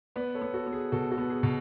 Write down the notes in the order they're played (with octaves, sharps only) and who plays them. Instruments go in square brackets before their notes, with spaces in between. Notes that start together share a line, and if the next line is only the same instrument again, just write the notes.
[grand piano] B3 B4 D5
A4 C#5
B3
F#4 A4
B3
G#4
B2 F#4 A4
F#4 A4
B3
G#4
B2